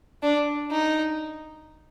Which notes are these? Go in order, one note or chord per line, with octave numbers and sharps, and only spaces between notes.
D4
D#4